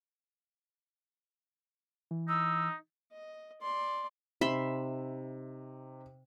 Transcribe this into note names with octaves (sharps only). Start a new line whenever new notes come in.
E3
D#4 E6
D#5
D5 C6
C3 D#4 E5 B5 C6